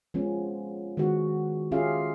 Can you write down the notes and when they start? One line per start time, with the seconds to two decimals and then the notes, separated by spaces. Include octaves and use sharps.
0.14 F3 G#3 B3 C#4
0.97 D#3 G#3 B3 F#4
1.72 C#4 F4 G4 G#4 E5 F5